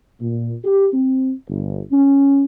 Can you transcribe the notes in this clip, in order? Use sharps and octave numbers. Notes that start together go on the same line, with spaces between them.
A#2
G4
C4
G1
C#4